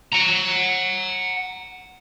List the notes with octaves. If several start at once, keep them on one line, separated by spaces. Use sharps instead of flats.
F#5 A#5